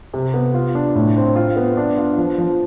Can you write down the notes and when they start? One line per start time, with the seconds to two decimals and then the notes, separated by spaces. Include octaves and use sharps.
0.14 C3
0.34 B3
0.54 F4
0.75 D4
0.95 A2
1.17 C4
1.36 F4
1.56 B3
1.77 D4
1.97 F4
2.17 F3
2.38 F3